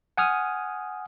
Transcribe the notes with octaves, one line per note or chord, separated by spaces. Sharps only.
F#5 G#5 D#6 F6